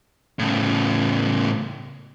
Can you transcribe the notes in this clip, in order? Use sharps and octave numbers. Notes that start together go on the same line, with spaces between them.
A2 C#3